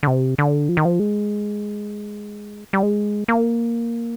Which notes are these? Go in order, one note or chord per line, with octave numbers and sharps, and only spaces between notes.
D3
C3
D3
F3
D#3
F3
G#3
G3
G#3
A#3